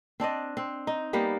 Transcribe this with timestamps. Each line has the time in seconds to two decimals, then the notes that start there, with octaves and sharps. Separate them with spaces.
0.20 C4 D4 D5 D#5
0.57 C4
0.87 D#4
1.13 G3 A#3 B3 G4